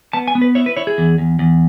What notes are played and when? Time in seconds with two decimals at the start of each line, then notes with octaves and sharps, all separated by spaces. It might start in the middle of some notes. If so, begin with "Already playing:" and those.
0.13 B3 A5
0.28 G#5
0.35 B3
0.41 B4
0.55 E4 C#5
0.66 B4
0.77 E4 C#5
0.87 G#4
0.98 E2
1.18 E2
1.39 E2